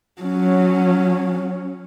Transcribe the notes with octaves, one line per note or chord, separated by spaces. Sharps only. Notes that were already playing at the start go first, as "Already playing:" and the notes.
F#3 C#4